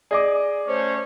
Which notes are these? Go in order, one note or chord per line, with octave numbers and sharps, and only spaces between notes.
G#4 D5 D#5 D6
A3 C#4 C5 C#5